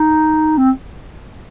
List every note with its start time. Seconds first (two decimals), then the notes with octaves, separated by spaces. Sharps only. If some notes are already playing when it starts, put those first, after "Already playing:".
Already playing: D#4
0.57 C4